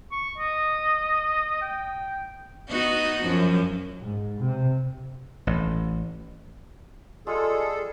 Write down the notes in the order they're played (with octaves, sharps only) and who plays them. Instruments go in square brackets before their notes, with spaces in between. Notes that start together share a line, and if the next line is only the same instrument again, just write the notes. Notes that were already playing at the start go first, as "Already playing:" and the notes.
[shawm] C#6
D#5
G5
[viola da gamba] B3 D#4 F#4
F#2 F3
[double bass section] G#2
C3
[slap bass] A1
[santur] G3 G#3 F4 [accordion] G#4 A4